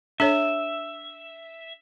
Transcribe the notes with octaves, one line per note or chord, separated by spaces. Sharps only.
D4 A4 C#5 E5